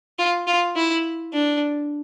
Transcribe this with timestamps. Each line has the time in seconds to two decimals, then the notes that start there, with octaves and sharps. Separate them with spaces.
0.19 F4
0.47 F4
0.76 E4
1.33 D4